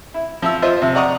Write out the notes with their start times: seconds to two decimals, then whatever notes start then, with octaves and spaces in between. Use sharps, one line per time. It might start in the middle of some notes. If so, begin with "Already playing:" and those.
0.14 E4
0.42 F3 E5 E6
0.62 F4 C5 D#5 E5
0.82 C3 F3
0.95 D5 D#5 F#5 A#5 C#6 D#6